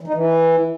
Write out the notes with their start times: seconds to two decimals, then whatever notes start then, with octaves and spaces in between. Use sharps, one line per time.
0.01 E3
0.07 D#4
0.14 E3